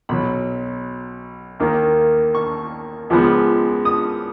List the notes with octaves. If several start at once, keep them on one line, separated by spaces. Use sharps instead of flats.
B1 B2 F#3 B5
D#2 D#3 A#3
C#6
C#2 C#3 F3 G#3 B3
D#6